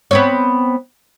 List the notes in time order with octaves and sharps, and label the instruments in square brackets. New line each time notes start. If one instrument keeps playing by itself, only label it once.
[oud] B3 C4 C#5